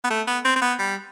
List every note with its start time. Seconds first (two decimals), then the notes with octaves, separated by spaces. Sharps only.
0.04 B3
0.10 A3
0.27 B3
0.45 C4
0.56 C4
0.62 B3
0.79 G3